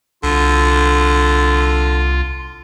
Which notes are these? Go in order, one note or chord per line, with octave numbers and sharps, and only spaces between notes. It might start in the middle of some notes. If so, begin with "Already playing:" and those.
C2 D3 F4